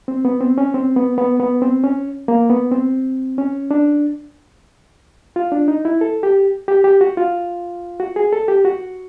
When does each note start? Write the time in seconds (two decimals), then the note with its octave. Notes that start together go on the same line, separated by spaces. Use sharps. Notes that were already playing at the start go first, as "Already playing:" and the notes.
0.08 C4
0.25 B3
0.41 C4
0.58 C#4
0.74 C4
0.96 B3
1.18 B3
1.40 B3
1.62 C4
1.84 C#4
2.28 A#3
2.50 B3
2.71 C4
3.38 C#4
3.71 D4
5.36 F4
5.52 D4
5.68 D#4
5.85 E4
6.01 A4
6.23 G4
6.68 G4
6.84 G4
7.01 F#4
7.17 F4
8.00 F#4
8.16 G#4
8.33 A4
8.48 G4
8.65 F#4